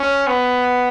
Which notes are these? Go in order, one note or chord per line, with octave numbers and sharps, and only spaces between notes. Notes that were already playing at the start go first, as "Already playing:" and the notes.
Already playing: C#4
B3